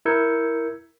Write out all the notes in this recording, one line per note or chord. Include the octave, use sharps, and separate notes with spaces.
E4 A#4 E6 G6 G#6 C#7